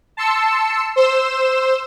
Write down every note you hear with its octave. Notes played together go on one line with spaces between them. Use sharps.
A5 C6 E6 C#7
C5 E6 E7